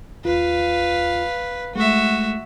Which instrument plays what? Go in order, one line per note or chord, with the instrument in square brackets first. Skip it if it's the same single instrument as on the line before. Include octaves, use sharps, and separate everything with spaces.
[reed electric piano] D#2 F4 [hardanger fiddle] B4 F5
[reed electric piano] G#3 A3 [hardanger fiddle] F#4 E5